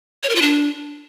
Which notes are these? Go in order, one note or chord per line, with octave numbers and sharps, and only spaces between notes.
C#5
A#4
F4
D4